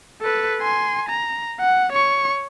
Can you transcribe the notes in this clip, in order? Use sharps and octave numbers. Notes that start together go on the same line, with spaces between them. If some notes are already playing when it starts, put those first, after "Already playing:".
A4 B4
G#5 C6
A#5
F#5
C#5 C#6